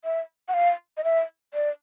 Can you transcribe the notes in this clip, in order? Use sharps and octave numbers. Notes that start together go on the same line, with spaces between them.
E5
F#5
F5
D#5
E5
D5